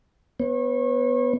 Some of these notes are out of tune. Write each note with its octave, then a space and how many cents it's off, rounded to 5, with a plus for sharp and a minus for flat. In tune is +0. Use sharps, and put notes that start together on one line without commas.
B3 +0 C#5 -35